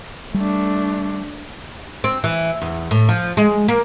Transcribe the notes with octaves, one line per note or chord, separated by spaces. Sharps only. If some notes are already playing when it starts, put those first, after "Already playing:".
G3 A3 D4
C4
E3
E2
A2
F3
G#3
A#3